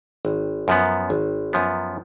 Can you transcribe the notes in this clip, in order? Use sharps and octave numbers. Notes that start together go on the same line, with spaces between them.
G#1
F#2 F3 B3
G#1
F#2 F3 B3